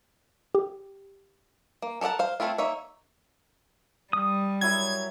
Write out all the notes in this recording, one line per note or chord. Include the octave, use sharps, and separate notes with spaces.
G4
A#3
A4 A#4 D5 F#5 A5
C5 F5
A3 C4 E4 F4
A#3 D#4 C#5 E5
G3 D#6
F#3 E4 A#4 G#6